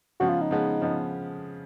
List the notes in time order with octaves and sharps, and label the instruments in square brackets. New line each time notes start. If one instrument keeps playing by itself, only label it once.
[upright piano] C#3 F3 G#3 B3 [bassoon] F#4
[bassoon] F4
D#4
[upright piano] C#3 F3 G#3 B3
C#3 F3 G#3 B3